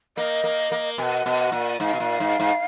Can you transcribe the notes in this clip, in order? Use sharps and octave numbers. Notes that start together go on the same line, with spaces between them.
A#3 D#5
A#3
A#3
B2 F#5 G#5
B2
F#5
A#2
G#2 F5 F#5
B2
A#2
G#2
G#2